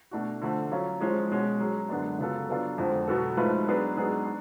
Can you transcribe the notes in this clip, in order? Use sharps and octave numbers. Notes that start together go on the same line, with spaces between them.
B2 A3 D4 F#4
D3 F3 A3
F#3 C#4 F4
F3 G#3 C#4
B2 G#3 C#4 F#4
F#3 C#4 G#4
F#2 D3 G#3 B3 D4
C#3 F#3 B3 F4 A4
F#3 B3 D4 F4 A4
F2 D3 F3 G#3
B2 F#3 B3 F#4 A4
G#2 F3 A3 F4 B4
F#3 B3 D4 G#4 B4
G#2 F#3 B3 D4 G#4
D4